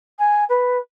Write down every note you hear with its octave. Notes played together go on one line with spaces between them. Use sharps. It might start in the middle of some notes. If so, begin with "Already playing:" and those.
G#5
B4